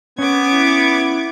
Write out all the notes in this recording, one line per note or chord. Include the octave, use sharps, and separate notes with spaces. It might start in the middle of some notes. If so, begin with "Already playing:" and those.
B3 C#4 D6 G#6
E4